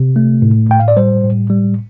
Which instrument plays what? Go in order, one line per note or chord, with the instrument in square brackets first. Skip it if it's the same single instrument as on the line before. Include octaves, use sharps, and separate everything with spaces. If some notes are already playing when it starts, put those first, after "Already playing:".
Already playing: [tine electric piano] C3
A3
A2
A2 G5
F5
D5
G3 C5
A2
G3